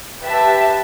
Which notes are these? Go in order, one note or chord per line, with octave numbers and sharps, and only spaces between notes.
G4 B4 E5 A5